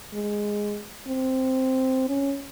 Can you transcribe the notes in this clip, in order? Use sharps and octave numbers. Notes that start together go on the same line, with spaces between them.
G#3
C4
C#4